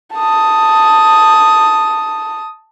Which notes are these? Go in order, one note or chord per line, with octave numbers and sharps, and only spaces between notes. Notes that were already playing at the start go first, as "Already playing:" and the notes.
A5 D#6